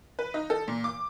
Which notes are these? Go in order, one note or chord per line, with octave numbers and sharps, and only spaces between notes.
B4
D#4
A4
A#2
D6